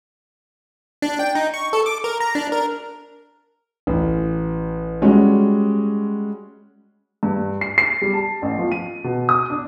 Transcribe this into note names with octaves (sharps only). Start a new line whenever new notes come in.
D4
G5
D#4
C#6
A4
D6
A#4
A#5
D4
A#4
A1
G3 G#3 C#4 F#4
G2
C7
C7
G3
A5
A1
F3
D#7
B2
D#6
D4